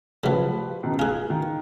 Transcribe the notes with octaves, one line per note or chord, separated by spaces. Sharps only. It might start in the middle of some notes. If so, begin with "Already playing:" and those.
C#3 F3 F#3 G4 B4
C#2 B2 D#3
F4 G#4 G#5 F#6
D#3